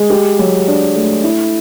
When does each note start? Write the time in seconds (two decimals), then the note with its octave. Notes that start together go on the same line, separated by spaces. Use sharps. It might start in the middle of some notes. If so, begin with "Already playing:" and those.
Already playing: G#3
0.10 G4
0.39 F#3
0.68 D4
0.95 A3
1.24 E4